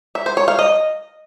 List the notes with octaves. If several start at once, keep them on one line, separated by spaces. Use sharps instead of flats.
E5
C5
C#5
F5
D#5